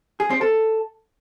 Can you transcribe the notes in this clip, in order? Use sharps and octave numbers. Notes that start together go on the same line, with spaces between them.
G#4
C4
A4